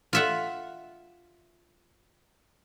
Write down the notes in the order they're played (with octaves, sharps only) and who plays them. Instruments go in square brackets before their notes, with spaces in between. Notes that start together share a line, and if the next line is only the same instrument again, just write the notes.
[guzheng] F4 E5 F#5